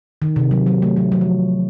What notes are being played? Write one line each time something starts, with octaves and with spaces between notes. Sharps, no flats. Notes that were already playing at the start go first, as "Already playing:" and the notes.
D#3
C3
F#3
F#3
A3
F#3
F#3
F3